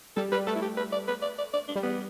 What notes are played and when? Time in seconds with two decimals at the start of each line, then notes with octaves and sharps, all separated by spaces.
0.16 G3 A4
0.32 G3 B4
0.47 A3 A4
0.56 E4
0.62 G4
0.77 B4
0.92 D5
1.08 B4
1.22 D5
1.38 D5
1.54 D5
1.68 D4
1.76 G3
1.83 B3